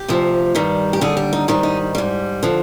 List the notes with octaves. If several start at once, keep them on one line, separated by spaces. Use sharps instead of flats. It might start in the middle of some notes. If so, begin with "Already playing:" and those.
Already playing: G4
D2 C3 F3
G2 D#3 G3
G4
D#2 D3 G3 G#4
G4
D#4
G#2 D#3 G3 D#4
D#4
G#2 G3
D3 F3